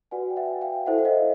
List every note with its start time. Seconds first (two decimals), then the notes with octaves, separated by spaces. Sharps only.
0.11 F#4 B4 D5 F#5 G#5
0.30 G5
0.37 E5 F#5
0.61 F5 G5
0.86 E4 A4 C5 E5 F#5
0.98 F#5
1.05 D#5 F5